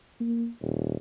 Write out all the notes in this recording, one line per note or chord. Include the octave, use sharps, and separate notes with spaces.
A#3
D#1